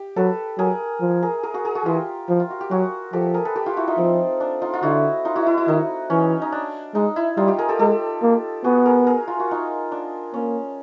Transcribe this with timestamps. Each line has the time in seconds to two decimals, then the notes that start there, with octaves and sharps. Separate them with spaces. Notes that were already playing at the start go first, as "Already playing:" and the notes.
Already playing: G4
0.16 F#3 A4 B4
0.58 F#3 G#4 A#4
1.01 F3
1.23 G#4 A#4
1.43 G#4 A#4
1.54 F#4 G#4
1.65 G#4 A#4
1.75 F#4 G#4
1.86 E3 F4 G4
2.29 F3
2.40 F4
2.50 F#4
2.61 G4
2.71 F#3 F#4 G#4
3.13 F3 G4 A4
3.34 G#4 A#4
3.45 A4 B4
3.56 G4 A4
3.66 F4 G4
3.77 E4 F#4
3.87 D#4 F4
3.98 F3 C4
4.40 D4
4.62 D#4 F4
4.73 F4
4.83 D3 E4 F#4
5.25 D#4 F4
5.36 E4 F#4
5.47 E4
5.58 E4
5.68 D#3 D#4
6.10 E3 C#4
6.42 D#4
6.52 D4
6.94 G#3 D#4
7.16 E4
7.37 G3 D#4 F4
7.48 F4 G4
7.58 G#4 A#4
7.69 G4 A4
7.79 G#3 G4 A4
8.22 A#3
8.64 B3 F#4 G#4
8.86 G#4 A#4
9.07 G#4 A#4
9.28 F4
9.40 F#4
9.51 D#4 F4
9.92 D4
10.34 A#3 C#4